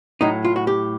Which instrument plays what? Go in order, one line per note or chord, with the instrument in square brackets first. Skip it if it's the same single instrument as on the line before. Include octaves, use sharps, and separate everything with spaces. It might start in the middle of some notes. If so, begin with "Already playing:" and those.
[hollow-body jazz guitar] A2 F#3 D#4
F4
F#4
G4